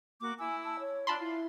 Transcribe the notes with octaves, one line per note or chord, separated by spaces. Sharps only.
A#3 F#4 A#4 D6
E4 G#5 E6
A5
C#5
D4 F4 A5 B5 C6
E4 F4